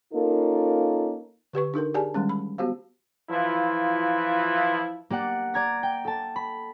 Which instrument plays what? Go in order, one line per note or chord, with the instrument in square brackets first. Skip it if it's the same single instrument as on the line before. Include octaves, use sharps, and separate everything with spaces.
[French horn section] A#3 C#4 D#4 F4 A4 A#4
[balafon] D3 G4 B4 C#6
D4 D#4 A4 A#4
G4 G#4 D5 G#5 A5
D#3 G3 G#3 C#4
B5
B3 F#4 G4 C5 F5
[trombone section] E3 F3 E4 F4
[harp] A#3 G4 D5 F#5
D5 A#5 G#6 A#6
G5
A4 A5
B5